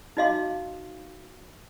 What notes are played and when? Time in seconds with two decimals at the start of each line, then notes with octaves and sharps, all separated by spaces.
0.17 D#4 F#4 D#5 F5 C6 D6